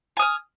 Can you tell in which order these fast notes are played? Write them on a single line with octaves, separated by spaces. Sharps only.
G#5 D#6 F6